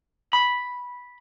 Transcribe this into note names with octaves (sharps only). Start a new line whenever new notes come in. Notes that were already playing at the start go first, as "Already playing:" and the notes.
B5